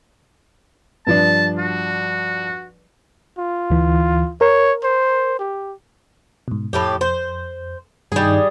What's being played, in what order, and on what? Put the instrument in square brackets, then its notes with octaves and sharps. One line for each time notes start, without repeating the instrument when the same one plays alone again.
[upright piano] G2 F3 D4 [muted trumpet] A5
[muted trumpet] F#4
[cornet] F4
[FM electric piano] D2 E3
[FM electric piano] A#4 [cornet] C#5
[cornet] C5
G4
[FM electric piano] G#2 B2
[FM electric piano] F2 [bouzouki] A2 A3 G4
[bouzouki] C5
[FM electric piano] G2 D#3 D#4 [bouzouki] G3 G#4